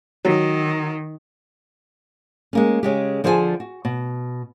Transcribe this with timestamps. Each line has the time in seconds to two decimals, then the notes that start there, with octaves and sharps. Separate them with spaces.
0.25 D#3 F#3
2.53 G#3 A#3 C#4
2.83 C#3 G#3 G4
3.24 D3 F3 G#4 C5 D5 G#5
3.60 F#4
3.85 B2